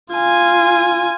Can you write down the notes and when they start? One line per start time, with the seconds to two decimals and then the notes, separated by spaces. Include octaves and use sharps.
0.13 F4 G#5